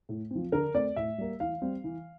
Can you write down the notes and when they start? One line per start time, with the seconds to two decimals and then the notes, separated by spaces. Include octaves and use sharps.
0.09 A2
0.31 F3 C4
0.52 D3 A#4
0.74 A3 C4 D5
0.96 A2 E5
1.18 G3 A#3
1.40 E3 F5
1.62 G3 C4
1.84 E3